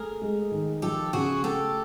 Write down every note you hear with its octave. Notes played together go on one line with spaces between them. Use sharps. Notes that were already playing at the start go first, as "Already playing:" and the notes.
Already playing: A3 G#4 A#4
G#3
D#3
F3 G4 A4
C#3 F#4 G#4
A3 G4 A4